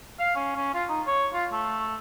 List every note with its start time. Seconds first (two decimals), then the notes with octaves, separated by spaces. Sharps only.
0.20 F5
0.36 C#4
0.56 C#4
0.74 F4
0.89 D#4
1.07 C#5
1.34 F4
1.52 A3